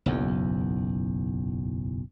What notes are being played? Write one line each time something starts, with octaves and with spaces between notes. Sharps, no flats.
F#1 B1 E2